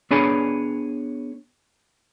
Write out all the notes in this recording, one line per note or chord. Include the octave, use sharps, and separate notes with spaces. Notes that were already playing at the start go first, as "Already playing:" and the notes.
B3 D4 G#4 C#5 G#5 B5